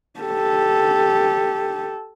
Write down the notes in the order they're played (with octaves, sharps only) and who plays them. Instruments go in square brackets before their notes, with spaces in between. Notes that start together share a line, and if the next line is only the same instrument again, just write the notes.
[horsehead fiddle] G4 A4